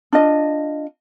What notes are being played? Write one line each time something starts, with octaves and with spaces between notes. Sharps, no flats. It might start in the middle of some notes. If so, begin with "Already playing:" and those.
D4 F4 D#5